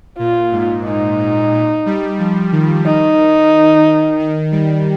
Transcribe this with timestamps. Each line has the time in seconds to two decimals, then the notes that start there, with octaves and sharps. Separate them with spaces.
0.19 A#2 F4
0.52 G#2
0.85 A#2 D#4
1.19 G#2
1.52 A#2
1.86 G3
2.19 F3
2.52 D#3
2.86 D#4
4.19 D#3
4.52 G3